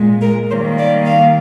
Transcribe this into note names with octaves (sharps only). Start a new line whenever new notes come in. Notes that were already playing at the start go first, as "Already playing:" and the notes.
Already playing: A#2 G#3
A#4
D#3 G3 A#3 C5
D5
F5